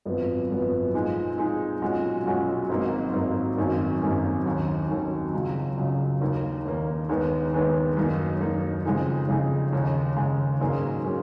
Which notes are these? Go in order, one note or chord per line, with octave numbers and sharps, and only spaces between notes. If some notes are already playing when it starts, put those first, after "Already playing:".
G#1 F#2 F3 B3
G#1 F#2 F3 B3
A#2 F3 G#3 D#4 G#4
A#2 F3 G#3 D#4 G#4
B1 A#2 G#3 C#4 F#4
B1 A#2 G#3 C#4 F#4
G#1 G#2 F#3 A#3
G#1 G#2 F#3 A#3
G#1 F#2 D#3 A#3 C#4
G#1 F#2 D#3 A#3 C#4
D#2 D#3 F#3 C#4
D#2 D#3 F#3 C#4
C#2 C#3 F#3
C#2 C#3 F#3
D#2 D#3 A#3
D#2 D#3 A#3
D#2 D#3 G#3 B3
D#2 D#3 G#3 B3
F#2 D#3 A#3 D#4
F#2 D#3 A#3 D#4
F2 C#3 G#3 D#4 G#4
F2 C#3 G#3 D#4 G#4
D#2 C#3 G#3
D#2 C#3 G#3
G#2 F#3 A#3 C#4 G#4
F#3 A#3 C#4 G#4